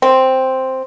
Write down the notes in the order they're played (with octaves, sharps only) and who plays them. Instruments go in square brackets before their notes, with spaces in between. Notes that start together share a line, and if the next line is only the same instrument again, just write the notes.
[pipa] C4